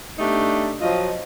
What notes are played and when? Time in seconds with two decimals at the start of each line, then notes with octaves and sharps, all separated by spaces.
0.19 A3 B3 D4 D#4 G4
0.81 F3 F#3 C4 F4 D#5